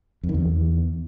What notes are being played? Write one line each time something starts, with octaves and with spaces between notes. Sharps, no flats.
F2
D#3
E2